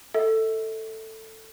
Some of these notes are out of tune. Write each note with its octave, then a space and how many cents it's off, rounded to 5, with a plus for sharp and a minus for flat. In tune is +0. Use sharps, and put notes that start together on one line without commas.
A4 +10 E5 -40